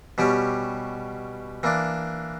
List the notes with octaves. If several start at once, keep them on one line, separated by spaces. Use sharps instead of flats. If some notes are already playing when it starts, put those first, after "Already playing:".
B2 G3 C#4 G4
E3 A#3 D4